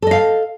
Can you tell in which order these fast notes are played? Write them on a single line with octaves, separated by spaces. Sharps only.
A4 D#5 F5